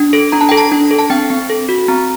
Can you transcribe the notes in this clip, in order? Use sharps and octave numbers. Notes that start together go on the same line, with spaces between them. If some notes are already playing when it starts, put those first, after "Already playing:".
Already playing: D4
A4
D4 A#5
A5
A4 G5
A5
D4
A4
A5
C4 G5
C4
A4
F#4
C4 A#5